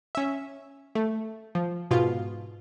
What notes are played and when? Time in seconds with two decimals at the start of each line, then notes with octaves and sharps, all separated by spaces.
0.15 C#4 E5
0.95 A3
1.55 F3
1.91 G#2 B2 F4